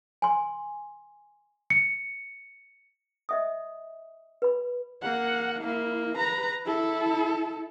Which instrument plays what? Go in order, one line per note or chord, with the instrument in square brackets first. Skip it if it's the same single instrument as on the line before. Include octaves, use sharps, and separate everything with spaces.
[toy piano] G#5 C6
[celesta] C#7
[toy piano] D#5 E5 D#6
B4 B5
[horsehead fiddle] A#3 F#5
A#3 E4
B4 A#5
E4 A4